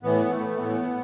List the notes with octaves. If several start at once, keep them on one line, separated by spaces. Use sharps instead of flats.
A2 E3 B3
A3
A2 E3 B3